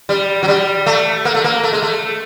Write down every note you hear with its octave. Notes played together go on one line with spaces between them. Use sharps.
G3
F#3
G3
A3
A#3
A3
A#3
A3
G#3
A3